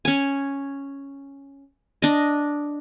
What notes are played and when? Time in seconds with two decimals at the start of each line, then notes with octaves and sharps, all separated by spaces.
0.05 C#4 G#5
2.02 D4 D#5